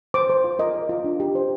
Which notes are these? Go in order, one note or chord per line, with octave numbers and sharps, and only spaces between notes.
C5 D6
C5
F4
A#4 D#5
A#4
F4
D4
G4
C5